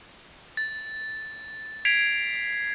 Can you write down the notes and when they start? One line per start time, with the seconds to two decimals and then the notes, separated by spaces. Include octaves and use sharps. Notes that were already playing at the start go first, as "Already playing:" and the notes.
0.57 A6
1.85 G#6 B6 C7 D7 F7